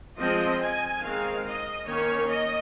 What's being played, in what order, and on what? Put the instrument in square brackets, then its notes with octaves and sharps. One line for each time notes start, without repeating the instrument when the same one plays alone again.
[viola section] F3 G#3 C4 D#5
G#5
D#3 G#3 C4 F5
D#5
D#3 A#3 C#4 C#5
D#5